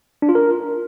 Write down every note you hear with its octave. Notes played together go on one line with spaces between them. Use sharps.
D4
F4
A#4